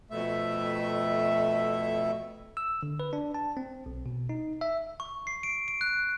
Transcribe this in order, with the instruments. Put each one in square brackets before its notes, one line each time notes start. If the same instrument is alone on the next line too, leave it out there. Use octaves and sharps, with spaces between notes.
[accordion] F2 B2 A3 E5
[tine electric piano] E6
D3
B4
D4
A5
C4
B1
B2
D#4
E5
[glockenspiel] C#6
C7
D7
D7
F#6